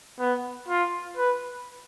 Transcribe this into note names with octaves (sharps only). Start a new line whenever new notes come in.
B3
F4
B4